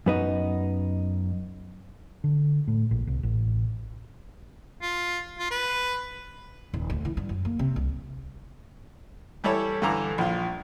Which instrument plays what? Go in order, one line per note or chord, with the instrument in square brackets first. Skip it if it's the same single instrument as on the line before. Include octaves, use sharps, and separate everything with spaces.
[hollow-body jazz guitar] F#2 B3 D#4
[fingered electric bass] D3
A2
A#1
C2
A1
[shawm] F4
F4
B4
[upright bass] D#1
D2
E3
G2
F#2
A#3
C3
C2
[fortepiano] E3 G3 E4 A4 C#5
G2 D3 E3 A#5 D6
A#1 F4